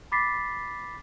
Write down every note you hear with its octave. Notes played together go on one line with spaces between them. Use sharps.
B5 D6 A6 B6 C7